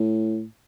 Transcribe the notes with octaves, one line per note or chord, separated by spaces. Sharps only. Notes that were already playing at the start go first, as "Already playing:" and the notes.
Already playing: A2